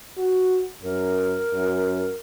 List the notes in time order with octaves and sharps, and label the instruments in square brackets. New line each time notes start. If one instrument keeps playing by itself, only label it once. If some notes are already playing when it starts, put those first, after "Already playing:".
[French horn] F#4
[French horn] F#2 [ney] A#4
[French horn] F#2